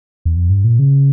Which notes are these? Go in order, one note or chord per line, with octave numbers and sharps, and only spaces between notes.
E2
F2
G2
A#2
C#3